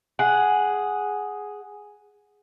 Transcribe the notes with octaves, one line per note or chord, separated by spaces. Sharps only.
G#4 F#5